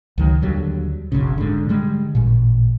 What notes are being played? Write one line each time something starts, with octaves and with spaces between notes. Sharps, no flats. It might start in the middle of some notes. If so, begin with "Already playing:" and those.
C#2 D#3 F#3
D#2 D3 F#3 G3
F#1 B1 F#2 C#3
G#2 D3
D3 G3 G#3
A1 A#2